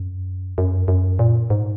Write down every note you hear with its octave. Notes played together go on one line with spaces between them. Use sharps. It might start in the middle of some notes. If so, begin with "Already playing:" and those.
Already playing: F#2
F#2
F#2
A#2
G#2